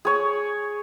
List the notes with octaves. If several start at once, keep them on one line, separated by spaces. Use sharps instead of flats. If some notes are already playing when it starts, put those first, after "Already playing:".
G#4 C#5